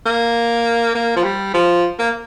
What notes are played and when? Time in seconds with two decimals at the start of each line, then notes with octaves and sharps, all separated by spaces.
0.06 A#3
0.95 A#3
1.16 F3
1.24 G3
1.54 F3
1.99 A#3